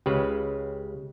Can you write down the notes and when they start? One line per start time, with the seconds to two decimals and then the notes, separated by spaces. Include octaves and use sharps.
0.06 C#2 C#3 G4 B4